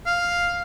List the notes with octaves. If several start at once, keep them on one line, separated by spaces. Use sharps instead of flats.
F5